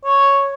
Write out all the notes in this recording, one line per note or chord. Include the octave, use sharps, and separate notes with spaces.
C#5